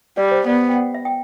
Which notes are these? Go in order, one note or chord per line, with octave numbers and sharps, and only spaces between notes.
G3 D5
C5
B3 D5
G5
F#5
E5
G5